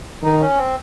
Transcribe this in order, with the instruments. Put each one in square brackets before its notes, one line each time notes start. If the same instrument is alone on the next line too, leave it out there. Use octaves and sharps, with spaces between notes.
[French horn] D#3 [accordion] D#4
[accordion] C#4
C4